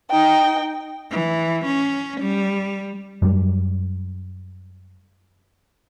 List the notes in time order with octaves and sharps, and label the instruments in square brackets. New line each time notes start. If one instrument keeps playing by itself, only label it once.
[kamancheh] D#4 G5
[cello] E3
C#4
G3
[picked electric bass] F#2 G3